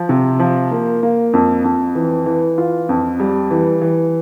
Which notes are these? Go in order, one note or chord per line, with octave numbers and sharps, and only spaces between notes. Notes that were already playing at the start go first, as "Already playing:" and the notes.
Already playing: F3
C3
F3
A#3
A#3
F2
F2
E3
E3
F4
F2
G3
E3
E3